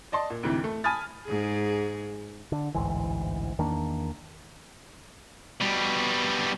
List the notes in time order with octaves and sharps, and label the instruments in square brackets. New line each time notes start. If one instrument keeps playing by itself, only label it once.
[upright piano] D5 D#5 A5 C6
A#2
D2 G#2 C3 E3
A3
G#5 A5 B5 D#6 F6 A6
[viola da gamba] G#2 G#4
[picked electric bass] D3
A1 D2 G#2 E3
E2 D#3 A#3 D4
[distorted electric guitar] B2 G3